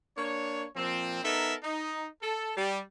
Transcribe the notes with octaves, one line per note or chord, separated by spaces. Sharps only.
A#3 D4 C#5
A#2 F3 C4
B3 D#4 A4 A#4 E5
D#4
A4
G3